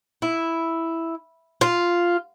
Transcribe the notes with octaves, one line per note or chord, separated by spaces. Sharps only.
E4
F4